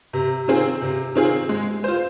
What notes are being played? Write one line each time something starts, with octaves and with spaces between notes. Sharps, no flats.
C3
D#3 C4 F4 G#4
C3
D#3 C4 F4 G#4
G#3
F4 C5